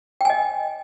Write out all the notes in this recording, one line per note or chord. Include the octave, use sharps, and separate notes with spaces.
D#5 G5 G#5